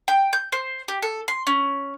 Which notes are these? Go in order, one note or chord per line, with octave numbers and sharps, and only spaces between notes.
G5
G6
C5
G4
A4
C6
C#4